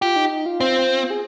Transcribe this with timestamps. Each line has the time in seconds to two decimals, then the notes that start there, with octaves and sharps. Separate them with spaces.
0.01 F4 G4
0.16 D#4
0.31 D#4
0.46 F4
0.60 C4
1.10 G#4